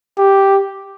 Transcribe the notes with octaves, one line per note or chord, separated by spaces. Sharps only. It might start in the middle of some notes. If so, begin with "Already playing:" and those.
G4